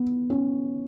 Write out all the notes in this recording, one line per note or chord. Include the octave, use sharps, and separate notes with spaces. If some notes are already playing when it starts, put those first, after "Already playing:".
Already playing: B3
C#4